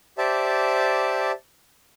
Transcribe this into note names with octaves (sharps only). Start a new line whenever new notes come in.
G4 C5 D5 E5 A5